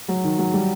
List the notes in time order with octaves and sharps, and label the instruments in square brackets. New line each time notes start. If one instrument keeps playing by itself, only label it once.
[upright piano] F#3
D#3
F#3
G3